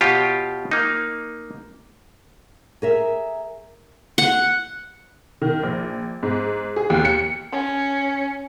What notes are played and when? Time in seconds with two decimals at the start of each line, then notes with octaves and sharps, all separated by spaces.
0.01 B2 F4 G4 C#5
0.71 A#3 D#4
2.82 G#4 A#4 E5
4.18 F#5
5.42 D#3
5.63 A#1
6.23 G#2
6.76 G#4
6.90 D#2
7.05 C#7
7.52 C#4